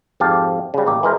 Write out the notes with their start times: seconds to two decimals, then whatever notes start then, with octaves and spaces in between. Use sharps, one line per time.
0.20 F2 G#2 G4 F5 A5
0.74 C#3 G3
0.86 A1 A#3 G4
1.03 E3 G#3 A#4 C5